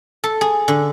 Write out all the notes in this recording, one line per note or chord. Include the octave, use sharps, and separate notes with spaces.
A4
G#4
D3